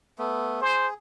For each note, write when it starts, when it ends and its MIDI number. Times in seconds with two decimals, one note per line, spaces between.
0.18 0.60 57
0.18 0.60 59
0.61 0.94 68
0.61 0.87 72